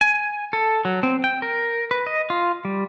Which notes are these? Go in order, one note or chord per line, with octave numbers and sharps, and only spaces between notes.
G#5
A4
F#3
C4
G5
A#4
B4
D#5
F4
G3